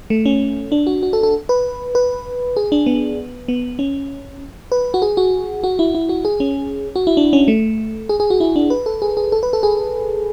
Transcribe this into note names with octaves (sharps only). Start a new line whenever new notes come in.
A3
C#4
D4
F#4
F#4
A4
A4
B4
B4
G#4
D4
B3
B3
C#4
B4
F#4
G#4
F#4
F#4
E4
E4
F#4
G#4
C#4
F#4
E4
D4
C#4
A3
G#4
G#4
F#4
E4
D4
B4
A4
G#4
G#4
A4
B4
A4
G#4